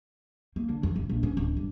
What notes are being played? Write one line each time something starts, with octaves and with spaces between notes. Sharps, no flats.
A#3
D3
F2
D1
A#1
C#4
D1
G2